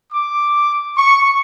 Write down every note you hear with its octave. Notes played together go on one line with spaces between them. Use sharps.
D6
C#6